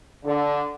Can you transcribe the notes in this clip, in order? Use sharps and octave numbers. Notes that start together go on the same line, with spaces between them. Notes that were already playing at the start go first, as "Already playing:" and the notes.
D3